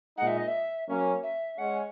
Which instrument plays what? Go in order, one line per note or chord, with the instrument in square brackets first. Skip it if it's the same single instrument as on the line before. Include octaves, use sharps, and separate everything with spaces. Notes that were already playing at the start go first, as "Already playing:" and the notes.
[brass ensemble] A#2 G#3 D#4 [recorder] F#5
[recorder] E5
D#5
E5
[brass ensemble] F#3 A#3 C#4
[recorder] E5
[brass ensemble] G#3 C#4 [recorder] F#5